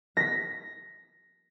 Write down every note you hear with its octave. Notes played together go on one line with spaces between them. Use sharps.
A#6 B6